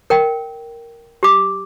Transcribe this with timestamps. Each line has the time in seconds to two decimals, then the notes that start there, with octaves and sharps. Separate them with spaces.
0.10 A#4 G5
1.23 G4 D6